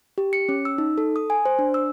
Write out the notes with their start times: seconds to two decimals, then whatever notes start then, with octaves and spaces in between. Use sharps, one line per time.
0.18 G4
0.33 C#7
0.49 C#4
0.65 E6
0.78 D#4
0.98 A4
1.16 D#6
1.30 G#5
1.45 C5
1.59 D4
1.74 E6